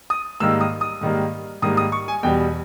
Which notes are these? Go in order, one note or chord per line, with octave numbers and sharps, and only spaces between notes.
D#6
G#2 D#3 G3 A#3 E6
D#6
D#6
G#2 D#3 G3 A#3
G#2 D#3 G3 A#3 D#6
D#6
C#6
G#5
E2 B2 G3 G5